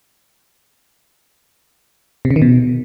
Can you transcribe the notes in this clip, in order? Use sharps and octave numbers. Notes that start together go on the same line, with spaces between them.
C3
C#3
D#3
B2